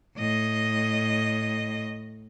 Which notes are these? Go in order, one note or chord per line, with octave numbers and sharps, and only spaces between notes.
A2 D#5